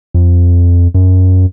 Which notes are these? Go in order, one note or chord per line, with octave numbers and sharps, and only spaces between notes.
F2
F#2